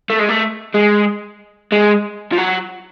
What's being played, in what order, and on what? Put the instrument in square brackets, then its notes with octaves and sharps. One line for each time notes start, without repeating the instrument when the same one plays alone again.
[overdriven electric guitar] A3
G#3
A3
G#3
G#3
F3
F#3